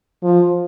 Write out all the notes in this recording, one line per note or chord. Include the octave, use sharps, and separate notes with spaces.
F3